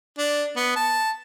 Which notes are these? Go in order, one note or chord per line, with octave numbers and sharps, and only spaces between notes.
D4
B3
A5